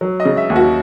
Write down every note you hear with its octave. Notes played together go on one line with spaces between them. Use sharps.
F#3
D#5
C#3
E5
D#2
F#4